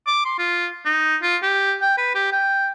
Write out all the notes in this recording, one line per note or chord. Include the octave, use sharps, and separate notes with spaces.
D6
C6
F4
D#4
F4
G4
G5
B4
G4
G5